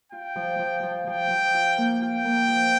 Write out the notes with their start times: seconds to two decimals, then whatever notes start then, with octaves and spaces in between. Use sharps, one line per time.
0.12 F4 G5
0.36 F3
0.59 F3
0.83 F3
1.06 F3 G5
1.30 F3
1.54 F4
1.78 A#3
2.01 F4 G5
2.25 A#3
2.48 F3